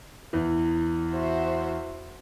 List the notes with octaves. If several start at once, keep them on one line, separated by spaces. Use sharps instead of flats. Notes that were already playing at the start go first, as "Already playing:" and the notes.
E2 E3
F#4 C5 E5